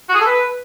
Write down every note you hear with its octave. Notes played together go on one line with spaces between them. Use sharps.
F#4
G#4
A4
B4